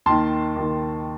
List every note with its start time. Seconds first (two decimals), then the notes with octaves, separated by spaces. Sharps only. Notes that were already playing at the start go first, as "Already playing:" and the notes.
0.06 D#2 D#3 A5 C6
0.56 D#2 D#3